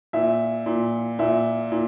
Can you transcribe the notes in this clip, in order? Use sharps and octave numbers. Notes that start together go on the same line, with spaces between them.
A#2 E5
A#2
A#2 E5
A#2